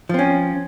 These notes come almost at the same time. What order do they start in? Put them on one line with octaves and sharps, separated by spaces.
F3 C4 C#4